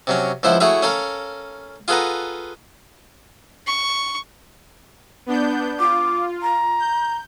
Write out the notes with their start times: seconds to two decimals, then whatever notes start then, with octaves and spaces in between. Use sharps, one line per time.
0.07 C3 F#3 C#4
0.43 C#2 F3 E4 C5 E5 F#5
0.60 A3 E4 F#4 G#4 C#5 E5
0.83 C#4 A4 A#4 F5
1.88 F4 G#4 A4 B4 F#5 A#5
3.67 C#6
5.26 B3 D4 G6
5.79 F4 D6
6.43 A#5
6.79 G6